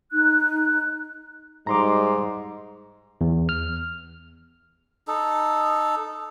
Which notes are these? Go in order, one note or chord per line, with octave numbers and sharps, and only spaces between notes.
D#4 F#6
G#2 G3 D#4 A#5 C6 D6
E2
F6
D#4 A4